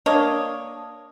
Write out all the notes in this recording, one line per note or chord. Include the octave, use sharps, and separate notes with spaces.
A#3 D4 C#5 D#5